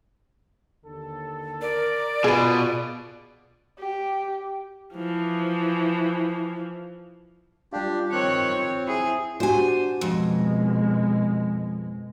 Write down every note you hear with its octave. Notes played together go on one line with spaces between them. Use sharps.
D#2 D3 A4
A#4 D5
B2 F4 G#4 B4
G4
E3 F3
G3 D4 F4 G4
D#3 C4 C#5 F#6
C4
E4 G#4
D4 F#4 G4 C5 G#5
F2 B2 G#3